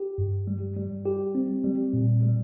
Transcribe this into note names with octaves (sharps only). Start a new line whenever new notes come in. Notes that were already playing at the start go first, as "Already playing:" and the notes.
Already playing: G4
G2
G3
G3
G4
C4
G3
A#2
G3